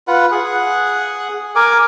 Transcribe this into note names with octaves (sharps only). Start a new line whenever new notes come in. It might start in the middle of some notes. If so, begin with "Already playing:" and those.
F4 B4 F#5
G#4 F#5
A#4 G#5 D6